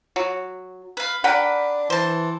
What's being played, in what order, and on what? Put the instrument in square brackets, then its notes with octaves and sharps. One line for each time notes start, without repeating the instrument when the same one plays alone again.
[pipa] F#3
[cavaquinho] B4 F5
[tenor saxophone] D4 [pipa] A#4 F#5 [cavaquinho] B4 G5 B5
[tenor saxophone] E3 [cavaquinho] C5 A5